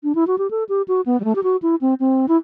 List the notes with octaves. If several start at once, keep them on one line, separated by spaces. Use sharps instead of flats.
D4
E4
F#4
G4
A4
G4
F#4
B3
G3
A3
G4
F#4
E4
C4
C4
E4